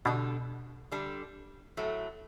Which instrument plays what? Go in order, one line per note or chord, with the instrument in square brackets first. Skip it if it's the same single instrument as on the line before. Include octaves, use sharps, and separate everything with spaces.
[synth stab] B2 [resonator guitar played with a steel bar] D3 G3 D4
[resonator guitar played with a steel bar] D3 G3 D4
A2 F#3 A3